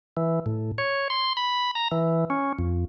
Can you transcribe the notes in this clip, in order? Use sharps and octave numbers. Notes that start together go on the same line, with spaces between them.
E3
A2
C#5
C6
B5
A#5
E3
C#4
F2